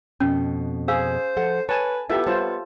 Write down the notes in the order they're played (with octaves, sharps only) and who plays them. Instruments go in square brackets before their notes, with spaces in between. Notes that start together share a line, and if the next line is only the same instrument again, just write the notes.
[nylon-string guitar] F2 B2 [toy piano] C#4
[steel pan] G#4 [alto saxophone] C5 [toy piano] F5 E6
[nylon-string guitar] F3 A4 F#5
[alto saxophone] B4 [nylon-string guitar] C#5 [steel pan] G#5 A5
[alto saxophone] B3 [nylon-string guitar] E4 F4 [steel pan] G4 A4 E5
[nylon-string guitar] G3 C#5 [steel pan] F4 C5 A5